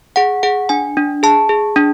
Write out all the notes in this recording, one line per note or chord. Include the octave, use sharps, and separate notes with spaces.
G#4 F#5
G#4 F#5
D4 G#5
D4
G#4 A5
G#4
D4